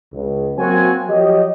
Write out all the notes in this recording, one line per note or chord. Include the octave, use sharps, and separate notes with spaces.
C#2
F#3 A#3 C4 F#4 G#5
F3 F#3 G4 D#5